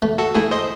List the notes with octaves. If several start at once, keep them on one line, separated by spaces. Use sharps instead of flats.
A3
F#4 A4
A3 E4 G#4
C5 D#5